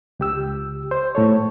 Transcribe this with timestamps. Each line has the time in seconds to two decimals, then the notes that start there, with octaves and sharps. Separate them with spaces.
0.20 C#2 G4 E6
0.91 C5
1.15 A2 A4 C#5